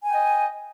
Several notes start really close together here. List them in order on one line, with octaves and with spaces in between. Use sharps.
G#5 G5 D#5